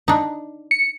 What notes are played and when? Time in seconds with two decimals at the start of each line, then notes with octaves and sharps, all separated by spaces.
0.08 D4 D#4
0.71 C#7